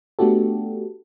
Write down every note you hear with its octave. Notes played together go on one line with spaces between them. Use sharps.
A3 B3 D4 F#4 G4 A4